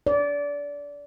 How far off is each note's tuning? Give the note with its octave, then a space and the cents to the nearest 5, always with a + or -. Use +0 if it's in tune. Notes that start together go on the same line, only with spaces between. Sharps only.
D5 -25